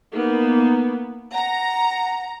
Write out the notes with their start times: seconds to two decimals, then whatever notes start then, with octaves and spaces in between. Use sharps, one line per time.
0.14 A#3 B3 D#4
1.33 F#5 A#5